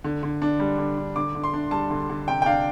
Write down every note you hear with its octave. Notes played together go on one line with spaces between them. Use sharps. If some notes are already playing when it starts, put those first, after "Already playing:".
D3
D3
D4
G3
D3
D3
D3 D6
D3
C6
D4
G3 A5
D3
D3
C3 G5
G5
D4 F5